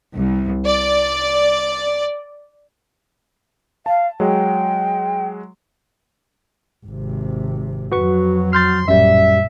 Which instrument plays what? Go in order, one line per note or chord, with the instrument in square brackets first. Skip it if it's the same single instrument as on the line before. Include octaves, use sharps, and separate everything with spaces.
[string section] C2
D5
[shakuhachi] F5 [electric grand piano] A5
[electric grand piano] F#3 G#3 [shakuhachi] G5
[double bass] G#1 C3
[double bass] F2 F#3 [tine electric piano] F#4 B4 C#6
[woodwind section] C6 [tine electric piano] F6 G6 A6
[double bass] A1 A#2 [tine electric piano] F#2 G3 [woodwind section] E5